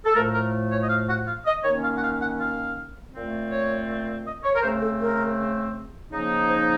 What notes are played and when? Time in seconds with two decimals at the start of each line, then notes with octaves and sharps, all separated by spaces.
0.05 A4
0.14 A2 F3 A3 A#4
0.33 A#4
0.71 C#5
0.81 D#5
0.89 F5
1.08 F#5
1.26 F5
1.46 D#5
1.64 D#3 A#3 C#4 C#5
1.82 F5
1.96 F#5
2.02 F5
2.20 F#5
2.39 F5
3.13 A#2 A3 C4
3.51 C#5
4.25 D#5
4.43 C#5
4.55 A#4
4.62 C#3 A3 C4 C5
4.81 A4
5.00 A#4
6.11 C#3 F3 A#3 D#4
6.49 C5